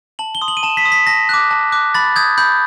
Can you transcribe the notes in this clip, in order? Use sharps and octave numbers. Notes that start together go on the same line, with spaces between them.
A5 F#7
G7
C6 D#6
F#7
D#7
A5 E7
B6
C6 D#6
B6
A5 A#6
D6 F#6
A5
D6 F#6
B5 A6
D#6 G6 G#6
B5 G6